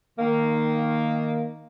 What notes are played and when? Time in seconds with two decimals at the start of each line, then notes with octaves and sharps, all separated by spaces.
0.19 D#3 A#3